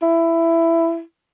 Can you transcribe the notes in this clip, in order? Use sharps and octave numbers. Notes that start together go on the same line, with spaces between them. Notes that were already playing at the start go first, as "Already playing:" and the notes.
E4